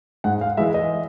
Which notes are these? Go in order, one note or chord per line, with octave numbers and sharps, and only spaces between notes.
G#2 F#5
F5
E3 G#3 E5
D#5